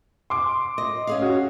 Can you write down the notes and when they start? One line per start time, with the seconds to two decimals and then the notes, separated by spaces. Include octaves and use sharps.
0.30 C6 D6
0.78 D#5
1.07 C#4 G#4 F5
1.22 F#4